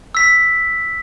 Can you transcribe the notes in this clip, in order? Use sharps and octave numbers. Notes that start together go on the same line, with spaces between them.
E6 B6